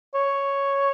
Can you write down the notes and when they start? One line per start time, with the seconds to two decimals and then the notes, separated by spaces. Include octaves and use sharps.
0.15 C#5